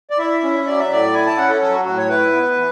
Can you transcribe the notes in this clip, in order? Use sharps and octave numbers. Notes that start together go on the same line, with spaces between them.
D5
E4 E5
C#4
F#3 D5
E5
A2 D5
E4 G#5
A5
C#4 F#5
A4
F#3 A4
F#4
A2 F#4
C#5
E4 B4
B3
E3